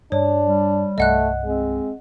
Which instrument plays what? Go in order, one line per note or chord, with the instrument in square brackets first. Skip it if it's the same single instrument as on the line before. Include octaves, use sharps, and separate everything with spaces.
[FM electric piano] G2 [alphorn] D4 [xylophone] C#5
[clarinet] G3
[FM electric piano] C2 G2 [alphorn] A3 [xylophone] D#5 F#5 F#6
[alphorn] G#3 [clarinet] C4